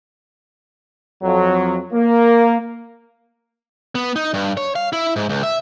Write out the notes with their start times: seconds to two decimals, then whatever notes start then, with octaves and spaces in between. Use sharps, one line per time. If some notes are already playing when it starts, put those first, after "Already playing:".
1.23 F2 F#3
1.93 A#3
3.95 B3
4.16 D#4
4.34 G2
4.57 C#5
4.76 F5
4.93 E4
5.16 G#2
5.29 C#2
5.43 E5